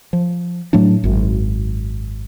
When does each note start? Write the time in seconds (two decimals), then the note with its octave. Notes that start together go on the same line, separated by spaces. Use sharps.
0.13 F3
0.73 A2 F#3 A3 D4
1.04 G#1 F#2